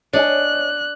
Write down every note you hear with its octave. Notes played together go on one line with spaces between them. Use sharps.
D4 C#5 D#5 G#5 F#6